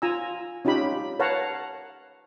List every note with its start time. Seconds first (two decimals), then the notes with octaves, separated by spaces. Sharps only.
0.02 F4 G#5 A#5 E6
0.65 C#4 D#4 F4 G4 B5
1.19 B4 C#5 F5 F#5 A5 A#5